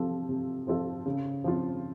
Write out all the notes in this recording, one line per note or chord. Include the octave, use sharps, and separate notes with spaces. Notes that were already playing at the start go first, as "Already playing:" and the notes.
Already playing: C3 F3 C4 F4 A4
C3
F3 C4 F4 A4
C#3
F3 C4 F4